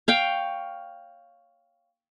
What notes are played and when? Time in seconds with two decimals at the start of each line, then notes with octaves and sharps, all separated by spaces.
0.08 C#5 F5 G5